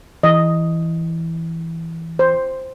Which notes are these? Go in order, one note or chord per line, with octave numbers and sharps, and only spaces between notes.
E3 D#5
C5